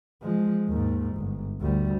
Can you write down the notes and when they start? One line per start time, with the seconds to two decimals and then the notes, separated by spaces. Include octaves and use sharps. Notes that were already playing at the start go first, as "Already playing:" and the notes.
0.22 F3 G#3
0.68 D#2 G#2
1.16 G1
1.60 D2 G3